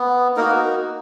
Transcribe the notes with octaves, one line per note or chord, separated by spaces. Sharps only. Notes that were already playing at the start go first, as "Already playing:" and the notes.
Already playing: B3
A#3 D#4 F#4 A#4